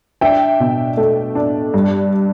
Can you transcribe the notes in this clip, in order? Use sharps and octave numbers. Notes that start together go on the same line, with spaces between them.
D4 E5 G5
B2
A3
D4
G2